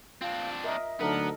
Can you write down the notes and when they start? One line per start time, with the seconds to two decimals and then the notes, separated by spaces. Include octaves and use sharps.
0.21 C4 D4 F4 F5
0.64 A#4 D#5 E5
1.00 D2 F#3 B3 D4 D#4 A4 A#4